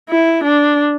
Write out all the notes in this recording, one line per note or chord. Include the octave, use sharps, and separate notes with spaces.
E4
D4